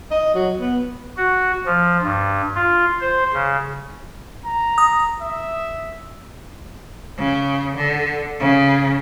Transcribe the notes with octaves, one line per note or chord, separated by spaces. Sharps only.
D#5
F#3
B3
F#4
F3
G2
F4
C5
C#3
A#5
D#6
E5
C#3
D3
C#3